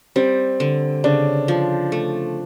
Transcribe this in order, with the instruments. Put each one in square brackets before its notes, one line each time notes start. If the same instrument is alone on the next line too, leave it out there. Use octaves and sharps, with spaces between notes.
[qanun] G3 [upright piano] C4
[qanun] D3
[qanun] C#3 [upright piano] D4
[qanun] F3
A3